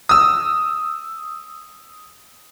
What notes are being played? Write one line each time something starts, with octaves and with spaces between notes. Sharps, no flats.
D#6 E6